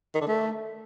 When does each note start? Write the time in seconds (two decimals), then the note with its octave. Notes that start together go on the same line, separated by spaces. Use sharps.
0.15 D#3
0.21 D3
0.28 A3